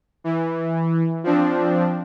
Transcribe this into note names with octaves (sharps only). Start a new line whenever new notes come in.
E3
F3 C4 D4